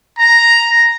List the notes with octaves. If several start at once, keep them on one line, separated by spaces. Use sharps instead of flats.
A#5